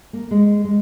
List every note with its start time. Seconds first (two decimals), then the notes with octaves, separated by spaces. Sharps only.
0.13 A#3
0.31 G#3
0.65 G#3